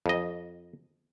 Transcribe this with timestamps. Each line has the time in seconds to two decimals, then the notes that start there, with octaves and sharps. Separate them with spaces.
0.06 F2 D#5